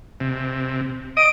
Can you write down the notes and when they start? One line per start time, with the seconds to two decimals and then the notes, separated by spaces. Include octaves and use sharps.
0.20 C3
1.17 D#5 D#6 D7